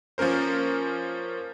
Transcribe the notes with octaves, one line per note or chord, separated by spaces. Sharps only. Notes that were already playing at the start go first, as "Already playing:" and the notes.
F3 A#3 C#4 A#4 C5